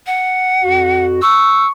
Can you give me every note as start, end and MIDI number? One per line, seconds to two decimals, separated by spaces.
0.07 1.05 78
0.63 1.21 41
0.63 1.21 66
1.22 1.70 85
1.22 1.67 88